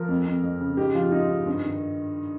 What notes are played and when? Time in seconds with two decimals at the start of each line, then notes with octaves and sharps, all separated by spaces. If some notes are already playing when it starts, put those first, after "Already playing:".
Already playing: F3 A#4
0.09 F2
0.26 F2
0.43 F2
0.61 C#3
0.77 G#2 G4
0.95 F3 F4
1.11 G#2 D#4
1.29 G#2
1.46 G2
1.63 D#3